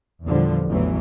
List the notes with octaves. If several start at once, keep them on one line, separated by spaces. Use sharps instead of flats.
E2 A#2 D3 F3 G3
A1 E2 E3 F#3